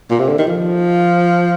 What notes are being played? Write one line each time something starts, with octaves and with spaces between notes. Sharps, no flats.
A#2
C3
D3
D#3
F3